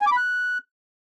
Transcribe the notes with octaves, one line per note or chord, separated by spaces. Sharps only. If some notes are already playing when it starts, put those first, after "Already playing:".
G#5
D6
B5
F#6